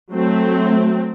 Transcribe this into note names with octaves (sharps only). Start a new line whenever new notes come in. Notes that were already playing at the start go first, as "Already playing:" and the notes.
F#3 A3 C4